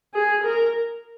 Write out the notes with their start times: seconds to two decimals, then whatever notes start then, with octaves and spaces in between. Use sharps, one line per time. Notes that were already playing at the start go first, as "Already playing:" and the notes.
0.14 G#4
0.44 A#4